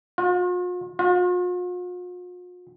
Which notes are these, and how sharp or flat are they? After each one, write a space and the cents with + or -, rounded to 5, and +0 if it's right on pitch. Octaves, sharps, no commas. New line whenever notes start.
F4 +45
F4 +45